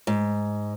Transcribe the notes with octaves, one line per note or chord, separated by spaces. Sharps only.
G#2